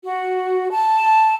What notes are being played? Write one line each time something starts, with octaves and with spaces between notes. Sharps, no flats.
F#4
A5